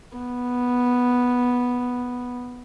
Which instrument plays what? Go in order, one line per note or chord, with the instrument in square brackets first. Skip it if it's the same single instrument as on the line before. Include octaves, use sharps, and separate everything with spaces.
[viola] B3